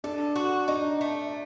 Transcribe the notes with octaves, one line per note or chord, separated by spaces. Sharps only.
D4 A4
F#4
D4 D#4
A3